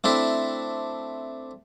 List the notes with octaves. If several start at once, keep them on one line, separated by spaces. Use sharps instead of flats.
A3 C4 D4 E4